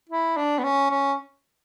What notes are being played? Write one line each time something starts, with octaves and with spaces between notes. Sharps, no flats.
E4
D4
B3
C#4
C#4